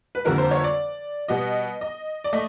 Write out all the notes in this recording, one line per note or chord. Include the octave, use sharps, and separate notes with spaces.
B4
F2 D3 G3 A#3 A#4
C5
C#5
D5
B2 G3 B3 D#5
D#5
D5
A3 D#5